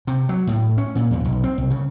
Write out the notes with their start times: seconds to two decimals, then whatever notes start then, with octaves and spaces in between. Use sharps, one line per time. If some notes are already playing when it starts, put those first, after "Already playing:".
0.07 C3
0.29 F#3
0.47 A2
0.78 C#4
0.95 A#2
1.11 E2
1.25 B1
1.44 C4
1.58 C2
1.70 C#3